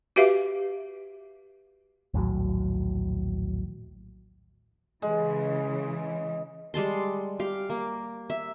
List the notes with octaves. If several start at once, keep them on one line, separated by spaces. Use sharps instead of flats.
F#4 G4 B4 E5 F5
A#1 D#2 A2 F#3
C#3 E3 G#3
G3 G#3 A5 C6
G4 F5
A#3
E5